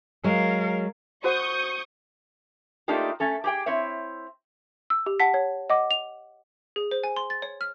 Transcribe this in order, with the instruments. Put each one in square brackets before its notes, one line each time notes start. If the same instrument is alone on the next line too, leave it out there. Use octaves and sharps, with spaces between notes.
[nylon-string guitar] F#3 G#3 [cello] A#4 F5
[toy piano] F#4 C5 F#5 [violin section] C#6 D#6 G6
[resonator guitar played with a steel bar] A3 A#3 D4 D#4 F4 G4
A3 C#4 A4
G4 G#4 G5
C4 E4 C#5 E5
[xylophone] E6
G4
F#5 A5 B6
C#5
D#5 F#5 D6
F7
G#4
C5
G#5
C6
A6
C#5
F6